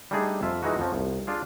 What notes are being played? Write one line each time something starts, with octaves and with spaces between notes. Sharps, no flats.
G3 A3 D4 D#4 G#4
F2 F4 E5
E3 G#3 D#4 F#4
F2 F3 C#4
C2
D4 F4 G#4